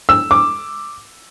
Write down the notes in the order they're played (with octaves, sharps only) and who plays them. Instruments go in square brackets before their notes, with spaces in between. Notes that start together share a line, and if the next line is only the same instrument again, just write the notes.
[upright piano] E6
D6